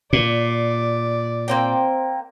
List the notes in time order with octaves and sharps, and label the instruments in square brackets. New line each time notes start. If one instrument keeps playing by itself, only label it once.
[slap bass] A#2 [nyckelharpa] D5
[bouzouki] A#3 C4 G5